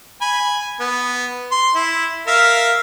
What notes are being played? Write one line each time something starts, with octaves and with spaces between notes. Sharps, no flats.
G#5 B5
B3
C6
E4
A#4 E5 F5